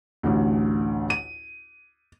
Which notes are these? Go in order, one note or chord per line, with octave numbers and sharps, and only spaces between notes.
A1 D2
D#7